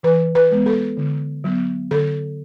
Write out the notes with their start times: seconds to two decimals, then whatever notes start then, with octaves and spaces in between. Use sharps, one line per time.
0.03 E3 B4
0.35 B4
0.51 G#3 B3
0.66 A4
0.97 D3
1.44 F#3 B3
1.91 D3 A4